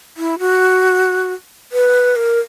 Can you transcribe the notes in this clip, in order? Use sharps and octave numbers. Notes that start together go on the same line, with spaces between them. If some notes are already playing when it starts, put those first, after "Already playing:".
E4
F#4
B4
A#4